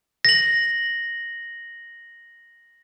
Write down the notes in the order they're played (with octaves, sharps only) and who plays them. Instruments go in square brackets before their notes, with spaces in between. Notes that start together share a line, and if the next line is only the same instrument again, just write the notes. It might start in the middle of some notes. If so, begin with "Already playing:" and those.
[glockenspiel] A#6 F#7